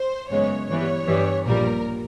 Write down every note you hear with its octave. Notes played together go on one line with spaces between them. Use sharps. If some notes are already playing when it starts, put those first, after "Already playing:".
Already playing: C5
F#2 C#3 E3 G#3 B3 C#5
G2 E3 G3 B3 C#5
G2 E3 G3 B3
A#1 A#2 G3 A#4